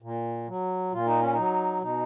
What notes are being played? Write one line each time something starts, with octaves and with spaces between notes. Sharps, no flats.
A#2
F#3
A#2 F4
D#4
C#4
F#3 D#4
B2 D#4